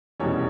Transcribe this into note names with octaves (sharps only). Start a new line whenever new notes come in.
F1 E2 B2 G3 C#4 C#5